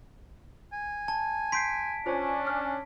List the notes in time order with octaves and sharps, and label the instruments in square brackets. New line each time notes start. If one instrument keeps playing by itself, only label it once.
[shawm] G#5
[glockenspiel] A5
[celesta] C6 G6 C7 [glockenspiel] B6 D7
[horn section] C#4 D4 [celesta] F4 C5 C#5
[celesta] C#5 F6